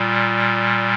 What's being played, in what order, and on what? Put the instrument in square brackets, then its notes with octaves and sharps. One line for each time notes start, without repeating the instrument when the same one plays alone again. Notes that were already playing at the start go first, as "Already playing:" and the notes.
Already playing: [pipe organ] A#2 G3